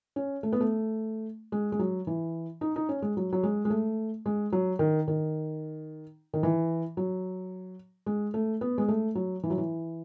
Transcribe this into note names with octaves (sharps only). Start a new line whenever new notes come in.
C#4
A3
B3
A3
G#3
G#3
F#3
E3
D#4
D#4
C#4
G#3
F#3
F#3
G#3
G#3
A3
G#3
F#3
D#3
D#3
D#3
E3
F#3
G#3
A3
B3
G#3
A3
F#3
E3
F#3
E3